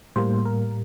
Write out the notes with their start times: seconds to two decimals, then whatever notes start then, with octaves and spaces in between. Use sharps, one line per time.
0.16 A2 G3 A#3 C5
0.45 A#4